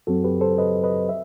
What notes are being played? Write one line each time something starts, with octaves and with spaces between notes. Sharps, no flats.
F#2 F#3 C4 F#4 A4
G4 B4
A4 C5
B4 D#5
B4 D#5
E5